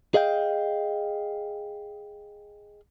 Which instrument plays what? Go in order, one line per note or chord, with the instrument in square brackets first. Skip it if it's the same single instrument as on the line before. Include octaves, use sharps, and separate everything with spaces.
[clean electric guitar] G#4 D#5 F5 G5